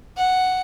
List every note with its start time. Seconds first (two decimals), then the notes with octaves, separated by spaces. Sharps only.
0.17 F#5